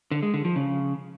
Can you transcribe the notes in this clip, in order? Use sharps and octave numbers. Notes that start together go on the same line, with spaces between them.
D3
G#3
D3
F3
C#3